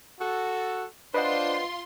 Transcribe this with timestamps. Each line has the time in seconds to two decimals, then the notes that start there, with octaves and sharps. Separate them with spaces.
0.19 F#4 A4
1.14 D4 F4 B4 C5 D#5 F#5 C6